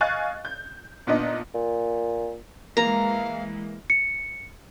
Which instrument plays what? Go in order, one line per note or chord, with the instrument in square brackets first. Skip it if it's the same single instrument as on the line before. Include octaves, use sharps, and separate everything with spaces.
[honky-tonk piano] D#5 F5 G#5 C#6 F#6 A6
G6
A#2 B3 D4 D#4 D#5
[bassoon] A#2
[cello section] E3 G#3 [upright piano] A#3 [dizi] F5 [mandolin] A#5
[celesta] C#7